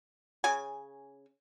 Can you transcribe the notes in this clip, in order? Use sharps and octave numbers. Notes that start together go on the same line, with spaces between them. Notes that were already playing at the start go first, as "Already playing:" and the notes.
C#3 C#4 G#5